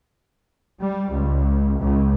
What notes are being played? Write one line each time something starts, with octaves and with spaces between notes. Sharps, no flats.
G3
C#2
C#2